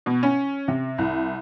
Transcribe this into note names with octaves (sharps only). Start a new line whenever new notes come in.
B2
C#4
C3
C2